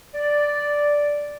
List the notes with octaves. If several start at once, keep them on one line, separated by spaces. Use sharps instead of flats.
D5